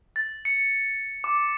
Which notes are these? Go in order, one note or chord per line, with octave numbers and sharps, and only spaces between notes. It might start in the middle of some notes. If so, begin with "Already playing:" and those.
A6
C#7
D6